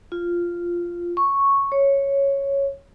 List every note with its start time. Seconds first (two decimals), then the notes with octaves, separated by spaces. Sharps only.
0.12 F4
1.17 C#6
1.72 C#5